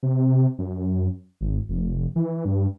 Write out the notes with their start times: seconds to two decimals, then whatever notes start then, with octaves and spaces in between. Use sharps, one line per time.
0.03 C3
0.59 F#2
1.41 G#1
1.69 F1
2.16 E3
2.45 G2